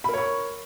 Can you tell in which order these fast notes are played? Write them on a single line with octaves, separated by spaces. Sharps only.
B5 A#4 C#5 C#6